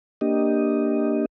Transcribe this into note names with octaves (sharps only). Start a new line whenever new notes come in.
A#3 D4 G4 D#5